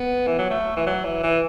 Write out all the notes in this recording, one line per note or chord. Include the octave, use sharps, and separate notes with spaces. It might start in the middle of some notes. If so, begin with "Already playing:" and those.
Already playing: B3
E3
F#3
A3
E3
F#3
E3
E3